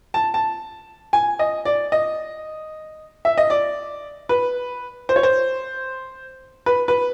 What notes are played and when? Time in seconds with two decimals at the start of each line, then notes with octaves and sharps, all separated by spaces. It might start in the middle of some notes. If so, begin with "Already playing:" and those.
0.14 A5
0.34 A5
1.13 G#5
1.39 D#5
1.65 D5
1.92 D#5
3.25 E5
3.38 D#5
3.50 D5
4.29 B4
5.09 C5
5.16 C#5
5.23 C5
6.66 B4
6.88 B4